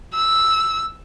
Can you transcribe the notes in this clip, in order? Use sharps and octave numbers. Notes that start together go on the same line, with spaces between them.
E6